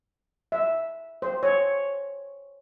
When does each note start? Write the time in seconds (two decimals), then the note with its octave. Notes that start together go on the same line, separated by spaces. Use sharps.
0.52 E5
1.22 C5
1.43 C#5